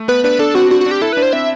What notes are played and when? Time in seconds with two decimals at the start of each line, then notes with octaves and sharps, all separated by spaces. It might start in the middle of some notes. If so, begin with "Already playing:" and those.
Already playing: A3
0.08 B3 B4
0.24 D4 B4
0.39 D4 A4
0.55 C4 F#4
0.71 D4 F#4
0.81 F#4
0.86 D4
0.91 G4
1.02 E4 A4
1.13 D4 B4
1.22 C5
1.33 C4 E5